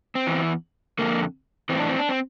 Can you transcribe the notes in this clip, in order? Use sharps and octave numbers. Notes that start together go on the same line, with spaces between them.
C4
E2 E3
F2 D3 A#3
A2 E3 C4
D4
C4
D4
C4